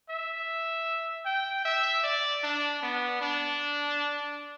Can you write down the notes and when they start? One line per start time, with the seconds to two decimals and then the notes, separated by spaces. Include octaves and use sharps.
0.09 E5
1.26 G5
1.65 E5
2.04 D5
2.44 D4
2.83 B3
3.21 D4